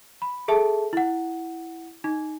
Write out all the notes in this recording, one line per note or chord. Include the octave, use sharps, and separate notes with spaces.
B5
G#4 A4 E5 A5
E4 F#5
D#4